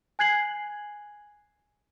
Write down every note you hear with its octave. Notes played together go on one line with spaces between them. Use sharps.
G#5 F#6 G#6 C7 F#7